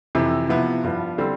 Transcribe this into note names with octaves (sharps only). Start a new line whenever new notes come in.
F2 C3 E3
C3 F3 B3 E4
G2 F3 B3
D3 G3 C4